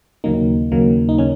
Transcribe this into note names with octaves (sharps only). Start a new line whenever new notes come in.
D#2 C#3 F#3 A#3 D#4
D#2 C#3 F#3 A#3
D#4
C#3 C#4